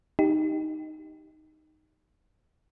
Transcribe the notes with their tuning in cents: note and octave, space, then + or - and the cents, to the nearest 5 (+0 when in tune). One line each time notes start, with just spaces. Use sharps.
D#4 +0 G4 +0